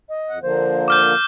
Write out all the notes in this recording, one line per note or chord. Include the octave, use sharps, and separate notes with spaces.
D#5
F2 F#5
D3 F3 A#3 C5
D6 F6 G6